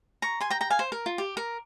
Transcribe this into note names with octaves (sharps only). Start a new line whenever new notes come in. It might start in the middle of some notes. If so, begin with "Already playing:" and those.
A#5 C#6
G#5 C6
G5 A#5
G5 A#5
F5 G#5
C5
A#4
F4
G4
A#4